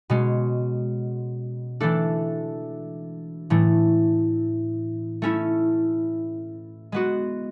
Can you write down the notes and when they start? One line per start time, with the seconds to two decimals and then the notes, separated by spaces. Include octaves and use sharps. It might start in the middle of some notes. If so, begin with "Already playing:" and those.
0.10 B2 G#3 C#4
1.80 E3 A3 D4 A4
3.50 A2 E3 A3
5.22 A3 C#4 E4
6.92 G#3 B3 F#4